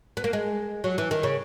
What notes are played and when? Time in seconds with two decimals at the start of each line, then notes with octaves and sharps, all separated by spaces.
0.17 B3
0.24 A#3
0.33 G#3
0.84 F#3
0.98 E3
1.11 D#3
1.23 C#3